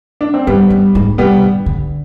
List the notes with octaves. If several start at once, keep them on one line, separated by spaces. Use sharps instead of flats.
D4
C4
G2 G3 B3
G2
G#2
C3 G3 B3
D3
D3